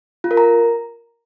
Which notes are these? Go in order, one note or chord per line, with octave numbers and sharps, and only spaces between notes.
F4
A#4
A#5